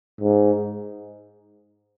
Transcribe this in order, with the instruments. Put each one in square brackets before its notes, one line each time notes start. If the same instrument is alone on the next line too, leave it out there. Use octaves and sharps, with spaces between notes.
[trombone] G#2